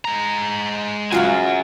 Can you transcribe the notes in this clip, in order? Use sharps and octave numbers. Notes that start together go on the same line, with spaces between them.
G#3 A#5
C#3 F#3 B3 F4 F#4 F#5 G#5